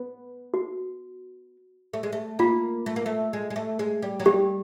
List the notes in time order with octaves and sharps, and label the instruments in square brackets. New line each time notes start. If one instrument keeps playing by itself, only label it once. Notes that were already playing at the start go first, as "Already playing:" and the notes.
Already playing: [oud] B3
[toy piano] F#4
[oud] A3
G#3
A3
[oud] A#3 [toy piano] F4
[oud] A3
A#3
A3
G#3
G#3
A3
G#3
G3
F#3
[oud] G3 [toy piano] G4